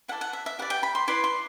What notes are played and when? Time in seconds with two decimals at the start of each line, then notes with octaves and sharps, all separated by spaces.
0.08 E4 A4 D5 F#5
0.21 F#5
0.33 E5
0.46 E5
0.59 G4 B4 D5 F#5
0.70 G5
0.83 B5
0.95 C6
1.08 E4 B4 D5 C6
1.24 C6